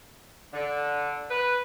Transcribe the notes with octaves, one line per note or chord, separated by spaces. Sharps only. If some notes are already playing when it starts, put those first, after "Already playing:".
D3
B4